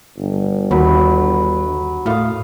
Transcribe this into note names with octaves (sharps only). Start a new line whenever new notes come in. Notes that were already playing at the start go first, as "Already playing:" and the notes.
G1
D#2 F#3 B5
A2 F5 D#6